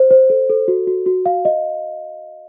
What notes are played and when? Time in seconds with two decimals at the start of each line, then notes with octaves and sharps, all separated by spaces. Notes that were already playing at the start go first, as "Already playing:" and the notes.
Already playing: C5
0.11 C5
0.30 A4
0.49 A4
0.68 F#4
0.87 F#4
1.06 F#4
1.26 F5
1.45 D#5